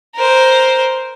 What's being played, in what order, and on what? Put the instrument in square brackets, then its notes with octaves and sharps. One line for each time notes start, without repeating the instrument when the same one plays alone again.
[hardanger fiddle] A#4 C5